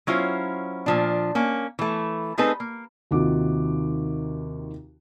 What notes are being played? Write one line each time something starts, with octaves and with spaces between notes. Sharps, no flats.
F#3 C#4 E4 F4 C5
A#2 F3 D4
A#3 C#4
E3 A3
A3 C4 D#4 G#4 A4 B4
A#3
D#2 C3 D#3 F4 F#4 D6